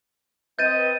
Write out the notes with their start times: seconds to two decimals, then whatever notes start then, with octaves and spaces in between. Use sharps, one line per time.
0.59 C4 B4 D#5 G6 A6 D#7